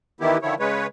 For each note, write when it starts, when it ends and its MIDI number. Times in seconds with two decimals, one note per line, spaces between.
0.20 0.37 51
0.20 0.37 52
0.20 0.37 59
0.20 0.37 64
0.20 0.37 67
0.42 0.55 50
0.42 0.55 51
0.42 0.55 53
0.42 0.55 64
0.42 0.55 73
0.59 0.87 49
0.59 0.87 56
0.59 0.87 71
0.59 0.87 73